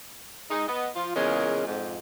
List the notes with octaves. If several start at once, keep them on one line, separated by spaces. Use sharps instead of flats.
G#3 D#4
B3 D#5
F3 F4
E2 A#2 C#3 G#3 C#4 A#4
F2 G#2